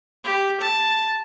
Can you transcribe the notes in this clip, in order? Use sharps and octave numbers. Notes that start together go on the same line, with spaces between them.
G4
A5